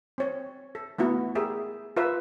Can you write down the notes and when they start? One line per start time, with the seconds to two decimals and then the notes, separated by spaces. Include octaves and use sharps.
0.18 C4 C#5
0.75 A4
0.98 A3 B3 E4 F#4
1.35 G4 G#4 A#4 E5
1.97 F4 A#4 B4 E5